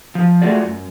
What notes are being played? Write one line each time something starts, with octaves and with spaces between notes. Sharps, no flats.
F3
G#3 A3 F4 F#4 G#4 D5
F#2